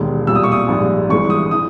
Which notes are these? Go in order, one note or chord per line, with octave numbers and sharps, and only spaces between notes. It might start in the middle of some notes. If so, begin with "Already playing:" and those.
Already playing: E1 D#2 D#3 G#3
B1 A#2 G3 E6
D#6
C#6
D#6
A#1 G#2 G3
G1 G2 E3 G#3 C#6
D#6
E3 D#6